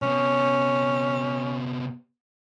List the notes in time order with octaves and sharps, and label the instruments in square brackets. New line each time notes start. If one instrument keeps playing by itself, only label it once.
[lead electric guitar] C3 B3 [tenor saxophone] C#4